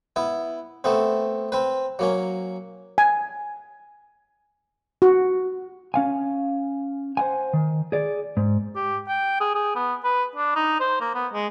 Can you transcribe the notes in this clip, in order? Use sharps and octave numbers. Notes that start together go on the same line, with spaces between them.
B3 E4
A3 B3 C4
C4 B4
F#3 A#3 C#4
G#5
F#4
C#4 F5 G#5
C5 F#5 G#5
D#3
G#4 D5
G#2
G4
G5
G#4
G#4
B3
B4
D4
D#4
C5
A#3
B3
G#3